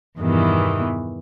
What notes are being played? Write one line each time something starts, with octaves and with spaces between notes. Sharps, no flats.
E2 G2 B2 D#3 E3